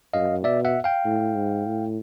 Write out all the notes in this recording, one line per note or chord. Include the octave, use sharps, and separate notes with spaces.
F#2 D#5 F5
B2 D5 E5
E5 F#5
F5 G5
A2
G#2
A2